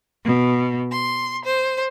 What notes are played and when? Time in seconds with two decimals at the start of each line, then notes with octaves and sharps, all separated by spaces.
0.25 B2
0.91 C6
1.44 C5